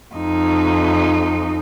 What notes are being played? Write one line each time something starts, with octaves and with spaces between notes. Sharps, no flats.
F2 D#4